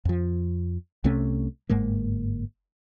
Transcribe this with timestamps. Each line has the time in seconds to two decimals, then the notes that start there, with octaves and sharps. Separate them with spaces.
0.05 F2 F3
1.04 C2 C3 A3 C#4
1.70 G1 G#2 G#3 A#3